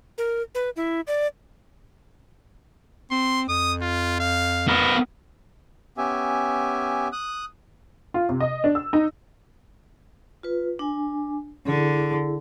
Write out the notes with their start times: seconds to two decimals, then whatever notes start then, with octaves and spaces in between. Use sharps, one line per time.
0.18 A#4
0.55 B4
0.76 E4
1.07 D5
3.11 C4 C6
3.49 F2 D#6
3.81 F4
4.20 F5
4.68 B3 A#4 B4
5.98 B3 C#4 G4 E5 G#5
7.12 D#6 F#6
8.14 F4
8.29 C3
8.40 D#5
8.64 D4
8.75 E6
8.93 D#4
10.43 F4 B4
10.79 D4 G#5
11.67 D3 E4 G#4